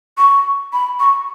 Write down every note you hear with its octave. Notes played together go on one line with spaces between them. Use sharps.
C#6
B5
C#6